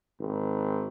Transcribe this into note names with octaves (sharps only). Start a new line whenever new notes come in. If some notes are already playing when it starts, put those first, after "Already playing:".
G#1